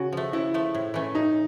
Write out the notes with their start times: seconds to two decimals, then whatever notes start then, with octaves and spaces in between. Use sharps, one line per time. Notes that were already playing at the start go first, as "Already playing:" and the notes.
Already playing: C#3 F#4
0.13 F3 A3
0.33 C#3 E4
0.54 F3 A3
0.75 A2
0.94 E3 A3 C#4
1.15 A2 D#4